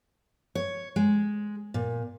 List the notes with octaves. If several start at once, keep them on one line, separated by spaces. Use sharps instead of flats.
C#5
G#3
A#2